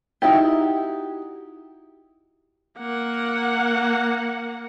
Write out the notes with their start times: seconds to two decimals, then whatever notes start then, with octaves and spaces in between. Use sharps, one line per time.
0.22 D#4 E4 F#4 G4
2.78 A#3 F#5